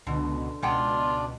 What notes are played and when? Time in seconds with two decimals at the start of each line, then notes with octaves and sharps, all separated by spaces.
0.07 C#2 B2 D3
0.62 C#2 B2 G#3 D4 F4 D5 F#5 G5